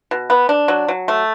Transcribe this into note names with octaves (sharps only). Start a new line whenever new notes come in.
B2
B3
D4
F#3
F#3
A3